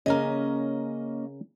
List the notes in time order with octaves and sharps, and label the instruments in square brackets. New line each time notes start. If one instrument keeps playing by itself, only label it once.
[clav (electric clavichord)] C#3 A#4 [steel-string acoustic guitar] A#3 C#4 D#5